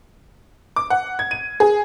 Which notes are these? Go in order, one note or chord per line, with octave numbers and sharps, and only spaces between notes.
D6
F#5
G#6
D#7
G#4